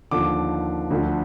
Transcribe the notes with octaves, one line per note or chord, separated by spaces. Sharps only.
D#2 D3 F3 D6
D2 D3 F3